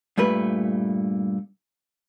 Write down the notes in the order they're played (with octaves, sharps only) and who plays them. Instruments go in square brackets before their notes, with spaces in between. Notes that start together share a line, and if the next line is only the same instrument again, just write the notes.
[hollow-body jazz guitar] G2 A#2 A3 B4